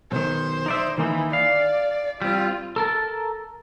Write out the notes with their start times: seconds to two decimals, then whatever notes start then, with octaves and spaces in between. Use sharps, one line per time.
0.12 B1 D#3 C5
0.66 D#4 D5 E5
0.98 D#3 E3 A#3 D#4
1.33 D5 F5
2.22 G3 C4 F4
2.76 A4 A#4 A5